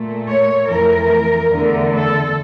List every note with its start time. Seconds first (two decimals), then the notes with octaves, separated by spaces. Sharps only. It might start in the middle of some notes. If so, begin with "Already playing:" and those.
Already playing: A#2 A3
0.29 C#5
0.69 F2 E3 A3 A#4
1.51 E2 D3 A3
1.92 A4